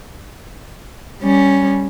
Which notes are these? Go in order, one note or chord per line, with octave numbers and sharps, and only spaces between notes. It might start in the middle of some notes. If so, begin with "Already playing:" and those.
G3 C#4